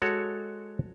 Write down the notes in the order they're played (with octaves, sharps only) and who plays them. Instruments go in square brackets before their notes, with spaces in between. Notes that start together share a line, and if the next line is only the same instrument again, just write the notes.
[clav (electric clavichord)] G#3 F#4 A4 C#5